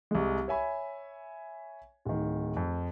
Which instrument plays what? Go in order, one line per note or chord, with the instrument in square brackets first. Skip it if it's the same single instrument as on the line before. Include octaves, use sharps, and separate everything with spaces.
[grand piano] C2 G#3
C#5 E5 G#5 B5
D1 D#3
F2